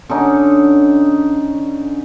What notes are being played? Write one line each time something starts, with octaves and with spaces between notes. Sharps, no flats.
D3 C#4 D#4